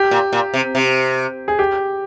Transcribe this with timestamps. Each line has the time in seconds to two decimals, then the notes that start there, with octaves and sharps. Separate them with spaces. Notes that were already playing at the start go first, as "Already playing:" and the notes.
Already playing: G4
0.11 A#2
0.33 A#2
0.54 C3
0.75 C3
1.48 G#4
1.59 G4